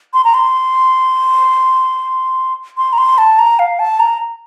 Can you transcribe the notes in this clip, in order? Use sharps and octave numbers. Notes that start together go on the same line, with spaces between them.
C6
A#5
C6
C6
A#5
C6
A5
A#5
F5
A5
A#5